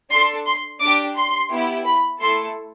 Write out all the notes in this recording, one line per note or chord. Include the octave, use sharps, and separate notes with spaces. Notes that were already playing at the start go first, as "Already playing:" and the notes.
D4 A4 C6
C6
D4 G4 D6
C6
B3 E4 G4
B5
A3 E4 A4 C6